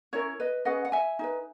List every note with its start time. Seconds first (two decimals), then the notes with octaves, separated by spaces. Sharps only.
0.13 C#4 E4 A#4 C#5
0.40 B4 D#5
0.65 C#4 G#4 B4 D#5 F#5
0.85 F#5
0.92 E5 G#5
1.19 D#4 G#4
1.24 B4